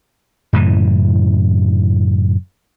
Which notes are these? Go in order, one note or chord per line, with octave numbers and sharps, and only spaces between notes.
F#2 A2 C#3 E3